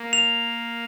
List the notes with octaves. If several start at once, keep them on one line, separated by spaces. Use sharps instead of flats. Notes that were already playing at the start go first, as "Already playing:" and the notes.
Already playing: A#3
F7